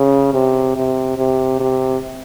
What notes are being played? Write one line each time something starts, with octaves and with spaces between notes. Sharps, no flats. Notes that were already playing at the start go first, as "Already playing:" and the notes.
Already playing: C#3
C3
C3
C3
C3